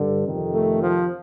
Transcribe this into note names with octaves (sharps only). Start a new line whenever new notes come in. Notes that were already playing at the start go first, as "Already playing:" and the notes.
Already playing: G2 D3
F2 C3 D#3
A3
F3